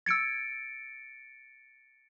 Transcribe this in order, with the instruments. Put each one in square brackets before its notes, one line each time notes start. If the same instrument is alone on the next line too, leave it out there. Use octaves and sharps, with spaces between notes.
[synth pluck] E6 G#6 [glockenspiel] A6 C#7 D7